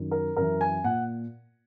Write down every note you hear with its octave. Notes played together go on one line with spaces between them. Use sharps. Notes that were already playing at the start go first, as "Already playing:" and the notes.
Already playing: F#2 D#3
A#4
F#2 E3 A#4
G#5
A#2 F#5